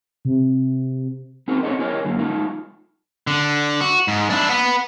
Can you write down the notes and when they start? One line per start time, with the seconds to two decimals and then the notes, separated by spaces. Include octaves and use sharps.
0.25 C3
1.48 C4 D#4 F#4 G#4 A#4
1.63 B3 C4 D4 A4 C#5 D#5
1.79 E4 G4 G#4 A#4 C#5 D#5
2.05 F#2 D3 A#3
2.19 G#3 A3 D#4 F4
3.27 D3
3.81 F#4
4.08 G#2
4.30 D4 E4
4.50 B4 F#5